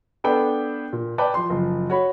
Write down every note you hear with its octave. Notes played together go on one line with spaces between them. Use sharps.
B3 D4 A4 B4 G5
A#2
B4 D5 G5 A5
F3 C6
F#1 F3
F#4 C#5 B5